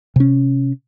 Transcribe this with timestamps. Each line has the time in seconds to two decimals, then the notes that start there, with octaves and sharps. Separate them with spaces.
0.16 C3 C#4